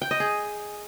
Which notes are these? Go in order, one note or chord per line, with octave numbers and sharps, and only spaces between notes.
G5
D#5
G#4